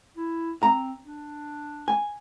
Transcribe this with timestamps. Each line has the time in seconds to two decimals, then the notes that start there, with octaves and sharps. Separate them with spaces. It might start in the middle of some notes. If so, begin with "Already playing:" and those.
0.17 E4
0.63 C4 A#5
1.05 D4
1.88 G#5